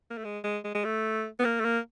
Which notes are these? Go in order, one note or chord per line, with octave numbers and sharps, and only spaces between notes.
A#3
A3
G#3
G#3
G#3
G#3
A3
B3
A#3
A3
A#3